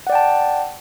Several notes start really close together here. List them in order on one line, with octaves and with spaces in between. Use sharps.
F#5 D5 G5 A5